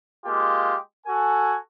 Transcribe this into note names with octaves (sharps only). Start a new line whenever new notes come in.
G#3 A#3 F4 G4
F#4 A4 G#5